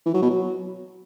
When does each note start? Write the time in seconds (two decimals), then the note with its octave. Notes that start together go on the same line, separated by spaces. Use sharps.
0.06 E3
0.14 F#3
0.22 B2
0.30 F#3